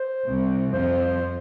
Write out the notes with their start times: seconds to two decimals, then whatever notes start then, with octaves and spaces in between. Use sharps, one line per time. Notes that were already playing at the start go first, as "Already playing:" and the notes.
Already playing: C5
0.26 C2 C3
0.73 F2 F3 C5